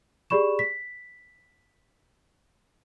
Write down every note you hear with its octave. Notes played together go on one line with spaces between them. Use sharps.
G4 G#4 D5 B5 C#6 E7
B6